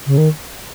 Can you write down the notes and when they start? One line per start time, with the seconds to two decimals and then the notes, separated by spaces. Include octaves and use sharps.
0.07 C#3
0.18 D#3